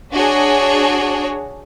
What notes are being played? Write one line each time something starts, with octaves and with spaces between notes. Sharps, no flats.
D4 F#4 G#4 C#5